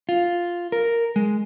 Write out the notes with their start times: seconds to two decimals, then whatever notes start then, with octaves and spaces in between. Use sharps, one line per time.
0.09 F4
0.72 A#4
1.16 G#3